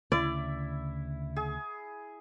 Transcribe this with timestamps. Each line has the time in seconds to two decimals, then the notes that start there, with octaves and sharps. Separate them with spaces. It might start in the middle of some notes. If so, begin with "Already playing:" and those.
0.12 D2 C#3 E4 D5
1.36 G#4